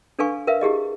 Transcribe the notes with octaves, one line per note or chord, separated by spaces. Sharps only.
D4 A4 B4 F5 G#5 C#6
A#4 B4 E5 F5
E4 G4 G#4 D#5